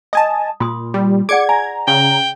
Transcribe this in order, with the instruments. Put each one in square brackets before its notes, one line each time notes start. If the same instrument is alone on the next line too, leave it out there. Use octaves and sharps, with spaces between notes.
[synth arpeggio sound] D#5 G#5 A5 [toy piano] D#6
[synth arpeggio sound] A#2 [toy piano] F4 C6 D#6
[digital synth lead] G3
[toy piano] G#4 D5 F#5 [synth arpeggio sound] D6 C#7 [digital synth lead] G#6
[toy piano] G#5 [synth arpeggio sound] A#5
[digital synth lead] C#3 [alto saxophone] G5